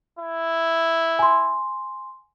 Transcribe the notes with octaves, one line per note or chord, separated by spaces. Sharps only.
E4
G#5 C6